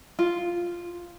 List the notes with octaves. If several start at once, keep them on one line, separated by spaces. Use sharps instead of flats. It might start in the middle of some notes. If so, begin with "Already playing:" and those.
F4